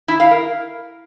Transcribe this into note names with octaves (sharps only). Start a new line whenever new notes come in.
E4
F5
A#4